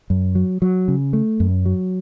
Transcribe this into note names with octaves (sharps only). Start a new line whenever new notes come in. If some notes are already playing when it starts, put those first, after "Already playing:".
F#2
F#3
F#3
C#3
A3
F#2
F#3